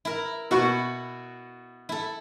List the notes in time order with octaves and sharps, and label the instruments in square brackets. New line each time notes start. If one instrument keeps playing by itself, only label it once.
[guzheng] E4 A#4
[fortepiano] B2 F#4 C#6 [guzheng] E4
[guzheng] E4 A4